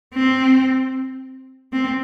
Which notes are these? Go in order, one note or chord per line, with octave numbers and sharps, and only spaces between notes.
C4
C4